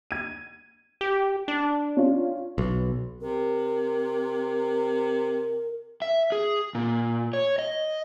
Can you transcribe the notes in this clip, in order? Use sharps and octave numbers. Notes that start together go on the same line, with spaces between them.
G#6 D#7
G4
D4
C#4 F4
B1
C3 A#4
E5
G#4
A#2
C#5
D#5